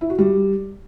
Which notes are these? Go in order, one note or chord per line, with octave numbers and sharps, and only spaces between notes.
E4
F#4
G3